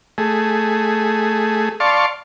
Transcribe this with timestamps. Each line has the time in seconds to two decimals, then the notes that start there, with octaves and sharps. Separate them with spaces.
0.18 A3 G#4
1.80 D5 F5 A5 C6 C#6